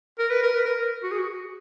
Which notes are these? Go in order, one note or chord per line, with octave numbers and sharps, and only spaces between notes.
A#4
B4
A#4
B4
A#4
F#4
G#4
F#4